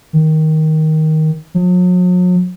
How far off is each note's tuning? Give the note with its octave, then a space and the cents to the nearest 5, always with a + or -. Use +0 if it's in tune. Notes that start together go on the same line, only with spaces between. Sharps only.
D#3 +10
F#3 -45